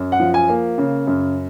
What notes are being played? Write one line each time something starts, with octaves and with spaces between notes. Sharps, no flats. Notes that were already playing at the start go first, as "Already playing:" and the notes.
Already playing: F#2
F#5
F3
G#5
A#3
C#3
F#2